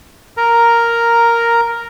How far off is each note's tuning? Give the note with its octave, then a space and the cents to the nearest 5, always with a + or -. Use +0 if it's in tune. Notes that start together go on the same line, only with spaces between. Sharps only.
A#4 +0 A#5 +0